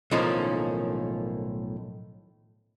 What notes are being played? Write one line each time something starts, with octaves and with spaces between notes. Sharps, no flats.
B1 A2 D#3 F3 A#3 C#4